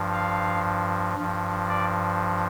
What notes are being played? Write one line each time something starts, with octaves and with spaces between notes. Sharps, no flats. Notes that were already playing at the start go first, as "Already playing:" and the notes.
Already playing: G2 F3
F5
G2 F3
D5